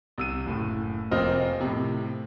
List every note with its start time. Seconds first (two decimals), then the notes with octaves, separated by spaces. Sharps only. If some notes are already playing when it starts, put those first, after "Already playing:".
0.18 C2 E6 D#7
0.46 F#1 A2
1.11 F1 A#3 C4 F4 D#5 F6
1.61 A2 C3